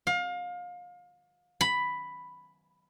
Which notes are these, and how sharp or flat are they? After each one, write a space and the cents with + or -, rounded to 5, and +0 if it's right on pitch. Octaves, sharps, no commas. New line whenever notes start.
F5 +30
B5 +5